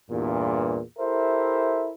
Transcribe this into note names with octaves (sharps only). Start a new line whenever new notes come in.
E2 G2 A#2
E4 G4 A4 A#4 C5 E5